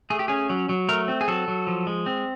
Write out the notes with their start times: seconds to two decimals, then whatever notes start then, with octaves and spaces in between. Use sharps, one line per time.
0.10 A3 G#4
0.19 G4
0.28 C#4 G#4
0.50 F#3
0.69 F#3
0.89 A3 A#4
1.08 C4
1.21 G#4
1.28 F#3 A4
1.48 F#3
1.67 F3
1.87 G#3
2.06 C4